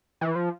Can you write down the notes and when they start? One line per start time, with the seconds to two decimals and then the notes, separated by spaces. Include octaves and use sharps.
0.21 E3
0.36 F3